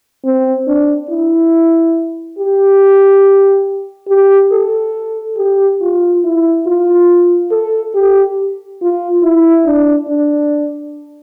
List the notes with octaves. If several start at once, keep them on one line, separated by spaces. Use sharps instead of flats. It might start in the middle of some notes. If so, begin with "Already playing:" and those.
C4
D4
E4
G4
G4
A4
G4
F4
E4
F4
A4
G4
F4
E4
D4
D4